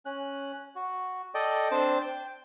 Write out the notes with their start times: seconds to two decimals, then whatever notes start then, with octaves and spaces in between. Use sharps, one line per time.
0.06 C#4 F#6
0.75 F#4
1.34 A4 D5 D#5 G5
1.71 C4 D4 C5 A5
2.01 G5